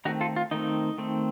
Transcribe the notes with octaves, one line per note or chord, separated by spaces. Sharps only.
D#3 A3 C4 D#4 F#4
F4 A4
F4
D#3 A3 C4 D#4
D#3 A3 C4